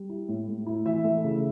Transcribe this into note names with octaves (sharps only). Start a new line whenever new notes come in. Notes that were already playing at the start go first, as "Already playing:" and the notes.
Already playing: G3
E4
A2
A2
E4
E3 E5
A3
C#3